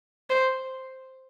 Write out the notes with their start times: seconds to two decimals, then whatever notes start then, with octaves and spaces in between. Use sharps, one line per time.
0.30 C5